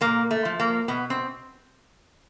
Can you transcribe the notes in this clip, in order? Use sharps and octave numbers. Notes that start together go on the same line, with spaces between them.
A#2 A#3
A3
F3
A#3
B2 B3
C4